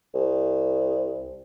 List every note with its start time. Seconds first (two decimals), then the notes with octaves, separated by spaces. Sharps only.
0.14 C2